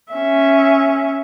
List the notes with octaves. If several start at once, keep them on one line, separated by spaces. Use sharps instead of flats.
C#4 E5